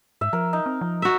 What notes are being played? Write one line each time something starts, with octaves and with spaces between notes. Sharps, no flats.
G#2 E5
F3 A#4
D#4
C4
F3
F#4 E5